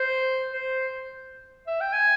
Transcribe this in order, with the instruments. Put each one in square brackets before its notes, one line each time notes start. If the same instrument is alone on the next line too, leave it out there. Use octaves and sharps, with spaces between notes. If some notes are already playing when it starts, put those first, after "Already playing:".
Already playing: [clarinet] C5
C5
E5
G5
G#5